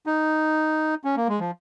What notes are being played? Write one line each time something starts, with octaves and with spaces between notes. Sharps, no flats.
D#4
C#4
A#3
G#3
F3